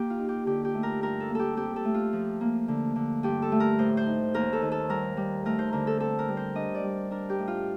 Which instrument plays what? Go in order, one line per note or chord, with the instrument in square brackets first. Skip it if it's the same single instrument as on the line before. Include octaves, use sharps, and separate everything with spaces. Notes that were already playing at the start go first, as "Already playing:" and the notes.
Already playing: [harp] A#3 G4
F4
D#4
G4
D3 G4
G4
A3
A#4
G2 A#4
A4
A#3
G4 A4
C4 G4
A4
A3
F4
F3
A#3
D3
D3
G2 G4
A4
A3
A#4
A2 C5
C5
D#4
D#2 A#4
A4
D#3
A4
G3 A#4
G3
A3 A#4
C5
D3 A#4
A4
C4 A4
A#4
G3
C5
D4 D#5
D5
G3
D4 A#4
G4
A2
F4